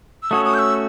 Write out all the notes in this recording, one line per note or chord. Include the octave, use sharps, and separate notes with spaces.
E6
A3 C#4 F#4 A4 C#5 D#6
D#6
G6
E6